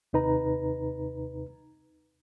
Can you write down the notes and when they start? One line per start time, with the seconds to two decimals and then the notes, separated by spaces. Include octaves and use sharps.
0.13 D#2 C3 D#4 B4 A#5